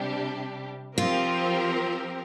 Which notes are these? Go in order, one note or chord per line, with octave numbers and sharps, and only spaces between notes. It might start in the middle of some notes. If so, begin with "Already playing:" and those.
Already playing: C3 G3 D4 G4
F3 C4 F4 G4 A#4